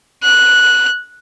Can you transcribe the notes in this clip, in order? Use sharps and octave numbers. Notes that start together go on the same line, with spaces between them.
F#6